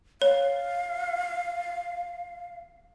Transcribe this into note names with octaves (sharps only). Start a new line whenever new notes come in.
C#5 F5